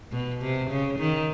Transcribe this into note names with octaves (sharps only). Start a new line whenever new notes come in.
B2
C3
C#3
D#3